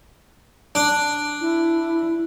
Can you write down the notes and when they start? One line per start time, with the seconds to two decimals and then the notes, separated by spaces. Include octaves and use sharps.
0.75 D4
1.41 E4